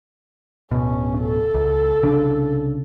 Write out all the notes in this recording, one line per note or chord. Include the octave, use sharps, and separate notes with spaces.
D1 B2 C#4
A4
C#2
C2 C#3 D4